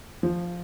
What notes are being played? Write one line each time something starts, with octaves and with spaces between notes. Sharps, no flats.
F3